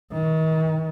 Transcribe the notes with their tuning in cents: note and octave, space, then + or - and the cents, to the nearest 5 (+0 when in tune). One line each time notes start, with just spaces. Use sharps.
D#3 +40